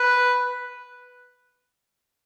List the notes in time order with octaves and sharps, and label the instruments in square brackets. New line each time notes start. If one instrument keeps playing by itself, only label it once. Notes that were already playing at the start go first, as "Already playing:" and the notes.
Already playing: [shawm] B4